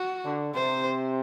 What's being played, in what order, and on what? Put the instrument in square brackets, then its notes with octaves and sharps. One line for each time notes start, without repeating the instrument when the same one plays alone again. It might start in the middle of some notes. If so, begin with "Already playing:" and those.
Already playing: [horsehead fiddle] F#4
[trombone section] D3
[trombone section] C3 [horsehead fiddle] C5